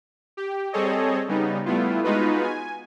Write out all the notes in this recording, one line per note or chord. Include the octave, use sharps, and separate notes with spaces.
G4
G3 C4 G#4 A4 C#5 D#5
C#3 G3 B3 D#4
G3 A3 B3 E4 F4
G#3 B3 D#4 F4 F#4 B4
G#5